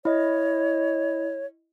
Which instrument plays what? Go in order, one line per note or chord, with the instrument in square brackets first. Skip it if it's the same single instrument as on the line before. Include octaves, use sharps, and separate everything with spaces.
[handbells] E4 D#5 [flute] C#5